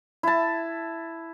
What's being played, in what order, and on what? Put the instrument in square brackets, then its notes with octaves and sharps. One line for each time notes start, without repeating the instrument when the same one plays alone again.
[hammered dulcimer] E4 A5